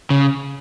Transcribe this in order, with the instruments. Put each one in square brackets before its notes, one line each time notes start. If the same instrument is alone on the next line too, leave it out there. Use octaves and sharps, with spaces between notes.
[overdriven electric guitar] C#3